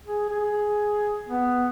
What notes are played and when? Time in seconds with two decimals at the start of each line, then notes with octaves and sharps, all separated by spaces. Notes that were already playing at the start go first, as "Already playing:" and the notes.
0.07 G#4
0.29 G#4
1.29 B3